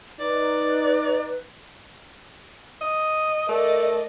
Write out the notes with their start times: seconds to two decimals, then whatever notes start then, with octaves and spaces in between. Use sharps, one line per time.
0.20 D#4 B4 D5
2.81 D#5
3.49 A3 A#4 D5 D#5